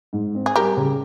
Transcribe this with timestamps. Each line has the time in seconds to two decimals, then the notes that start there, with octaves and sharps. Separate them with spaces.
0.13 G#2
0.35 C4
0.46 G#4
0.56 G3 G4 A#4
0.77 C#3